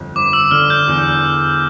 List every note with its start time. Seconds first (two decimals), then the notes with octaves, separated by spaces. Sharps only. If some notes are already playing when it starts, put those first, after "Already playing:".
Already playing: G1 F2
0.16 G1 D6
0.33 E6
0.51 D3 F6
0.70 G6
0.88 E2